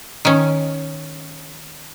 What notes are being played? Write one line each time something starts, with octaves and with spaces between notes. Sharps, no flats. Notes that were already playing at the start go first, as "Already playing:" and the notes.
D#3 C#4